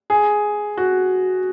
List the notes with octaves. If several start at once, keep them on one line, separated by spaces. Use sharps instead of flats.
G#4
F#4